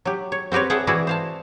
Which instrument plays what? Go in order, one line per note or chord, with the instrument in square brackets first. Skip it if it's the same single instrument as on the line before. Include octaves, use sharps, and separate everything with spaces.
[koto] F#3 G4
C#5
C4 F#4 G4 B4 C#5
G#4 E5 F#5 G5 A5
E3 E4 F#4 G#4 D5
C5 F5 A5